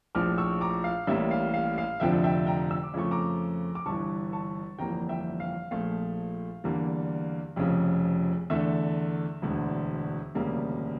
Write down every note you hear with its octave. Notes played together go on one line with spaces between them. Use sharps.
A#1 A2 F3 D6 F6
C#6 E6
A#5 D6
F5
A1 A2 G3 A#3 E5
F5
F5
F5
F1 F2 D3 F3 E5 G5
E5 G5
G5 A#5
E6
D6
F2 C#3 F3 A3 C#6
A#5 D6
D6
G1 G2 E3 A5 C#6
A5 C#6
G1 F2 E3 G3 A#3 G5 A#5
E5 G5
F5
A#1 A#2 F3 A3 F5
E2 D3 G3 A#3
F1 F2 C#3
E2 D3 A3 E5
E1 D2 D3
E1 D2 C#3 G3 A#3